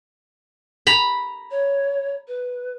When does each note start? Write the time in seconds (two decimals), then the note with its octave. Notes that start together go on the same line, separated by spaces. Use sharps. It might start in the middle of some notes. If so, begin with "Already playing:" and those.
0.87 A#5 B5
1.51 C#5
2.28 B4